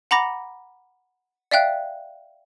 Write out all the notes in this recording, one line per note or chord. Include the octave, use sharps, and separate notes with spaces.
F#5 A#5 B5 D6 A#6
D5 E5 F5 G5 F#6